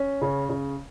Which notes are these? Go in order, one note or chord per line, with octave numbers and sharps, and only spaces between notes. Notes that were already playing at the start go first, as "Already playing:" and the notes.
Already playing: C#4
C#3
C#3